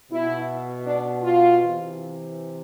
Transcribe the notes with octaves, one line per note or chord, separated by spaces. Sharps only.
B2 E4
D4
F4
C3 E3